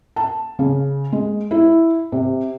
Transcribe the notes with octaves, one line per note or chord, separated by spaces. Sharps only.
A5
C#3
G#3
E4
C3